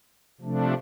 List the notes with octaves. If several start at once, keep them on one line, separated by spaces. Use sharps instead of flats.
C3 F3 A3 D4